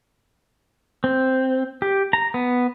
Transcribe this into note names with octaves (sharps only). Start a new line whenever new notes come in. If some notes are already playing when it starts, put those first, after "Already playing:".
C4
G4
A#5
B3